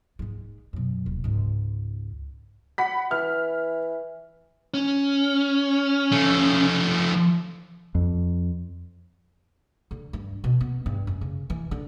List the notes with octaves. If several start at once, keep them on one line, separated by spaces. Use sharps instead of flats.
G#2 G#3
F#2 B2
D#1
C#2 G#2
F#5 B5 B6
E3 F6
C#4
F3 A3
F2
D3
G2
B2
B3
G2
F#2
C#3
E3
D3